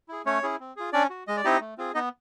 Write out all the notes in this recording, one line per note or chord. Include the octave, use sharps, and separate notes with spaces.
E4 G#4
A3 C#4 C#5
C#4 E4 G#4
C4
F4 G#4
C#4 D4 D5
F#4
G#3 D#5
D5
C4 D#4 E4 G4 D#5
A3
C4 F4 G#4
B3 D#4 D#5